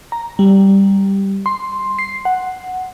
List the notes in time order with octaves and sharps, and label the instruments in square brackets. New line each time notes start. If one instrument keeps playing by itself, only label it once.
[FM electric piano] A#5
G3
C6
C7
F#5